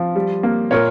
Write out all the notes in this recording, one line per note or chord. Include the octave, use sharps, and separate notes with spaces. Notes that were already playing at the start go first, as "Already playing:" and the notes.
Already playing: F3
G3
A#3
A#2 A#4 C#5